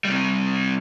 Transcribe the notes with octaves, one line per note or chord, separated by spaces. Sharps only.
C3 G3